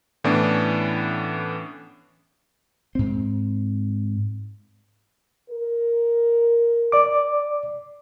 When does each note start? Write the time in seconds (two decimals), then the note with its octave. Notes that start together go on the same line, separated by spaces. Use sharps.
0.24 A2 E3 B3 C#4 D4
2.95 G#2 C4
5.51 A#4
6.92 D5 D6